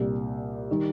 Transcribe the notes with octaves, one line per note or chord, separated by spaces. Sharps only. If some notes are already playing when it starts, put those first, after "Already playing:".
Already playing: C2 A#2 G3
D#3 G3